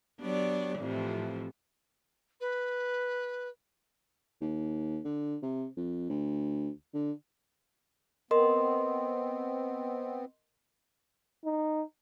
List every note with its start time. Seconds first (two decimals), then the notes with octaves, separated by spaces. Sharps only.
0.21 F#3 B3 D4 G4 C#5 D5
0.79 F2 A2 C3 E3 F3
2.40 B4
4.41 D#2
5.05 D3
5.43 C3
5.77 F2
6.10 D2
6.94 D3
8.31 B3 C4 A#4 D#5 C6
11.45 D#4